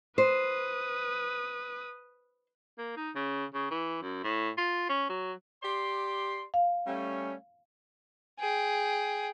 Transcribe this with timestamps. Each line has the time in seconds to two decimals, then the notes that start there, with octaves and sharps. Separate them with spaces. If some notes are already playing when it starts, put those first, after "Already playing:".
0.18 B4 C5 D#6
2.78 A#3
2.96 D#4
3.16 C#3
3.54 C#3
3.71 E3
4.02 F#2
4.24 A2
4.57 F4
4.89 C#4
5.09 F#3
5.63 G4 D5 C6
6.54 F5
6.87 G3 A3 C#4
8.39 G#4 G5